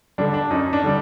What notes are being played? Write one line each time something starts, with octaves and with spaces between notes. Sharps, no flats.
D3 G3 D4
D4
F#2 D#4
D4
D3 G3